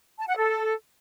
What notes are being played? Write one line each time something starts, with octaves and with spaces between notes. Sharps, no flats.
A5
F#5
A4